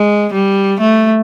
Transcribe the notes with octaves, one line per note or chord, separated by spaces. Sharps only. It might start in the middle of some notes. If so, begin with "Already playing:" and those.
Already playing: G#3
G3
A3